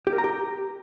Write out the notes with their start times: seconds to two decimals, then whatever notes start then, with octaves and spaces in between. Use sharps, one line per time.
0.07 G4
0.13 A#4
0.18 A#5
0.24 G4